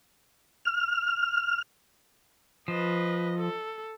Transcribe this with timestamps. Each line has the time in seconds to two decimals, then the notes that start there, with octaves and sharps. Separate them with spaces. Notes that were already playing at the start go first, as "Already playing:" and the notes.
0.65 F6
2.68 F3 B4 D#5
3.38 A4